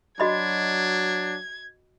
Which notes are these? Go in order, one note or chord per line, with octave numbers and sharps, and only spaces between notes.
F#3 D4 F#4 D#5 B5 G#6